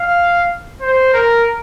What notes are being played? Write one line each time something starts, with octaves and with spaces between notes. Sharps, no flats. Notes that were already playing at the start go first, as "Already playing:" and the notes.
Already playing: F5
C5
A#4